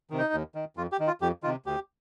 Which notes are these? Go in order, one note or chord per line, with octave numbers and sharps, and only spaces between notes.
C3 D#3
D#4
D#2
D#3
F2 F4
G4
D#3
F4
F2 G4
C3 D#3 F4
D2 G4